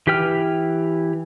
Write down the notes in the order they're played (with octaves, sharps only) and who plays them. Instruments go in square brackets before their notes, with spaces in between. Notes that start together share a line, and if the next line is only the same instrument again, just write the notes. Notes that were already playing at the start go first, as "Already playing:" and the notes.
[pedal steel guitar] E3 G4 B4 G5 F6